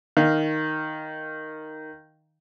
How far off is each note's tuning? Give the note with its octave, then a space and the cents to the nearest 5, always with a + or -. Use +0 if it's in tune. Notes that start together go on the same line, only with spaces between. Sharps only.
D#3 +0 F5 +0